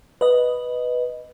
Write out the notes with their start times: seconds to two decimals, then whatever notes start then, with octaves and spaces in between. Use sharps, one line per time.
0.21 B4 D#5